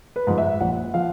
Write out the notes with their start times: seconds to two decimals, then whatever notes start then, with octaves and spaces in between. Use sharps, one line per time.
0.16 B4
0.27 G#2 F3
0.38 E5
0.60 A#1 F#5
0.94 F3 F5